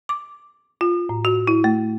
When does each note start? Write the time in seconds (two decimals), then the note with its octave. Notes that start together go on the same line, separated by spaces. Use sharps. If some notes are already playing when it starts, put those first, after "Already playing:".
0.09 D6
0.81 F4
1.09 A2
1.25 F#4
1.47 E4
1.64 A3